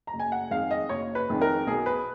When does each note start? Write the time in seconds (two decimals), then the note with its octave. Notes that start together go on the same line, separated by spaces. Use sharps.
0.07 A#5
0.13 F#1
0.19 G#5
0.32 F#5
0.51 F2 D#3 G#3 F5
0.71 D#5
0.89 F#1 C#5
1.15 B4
1.29 F2 D#3 G#3
1.41 A#4
1.67 B1 G#4
1.86 B4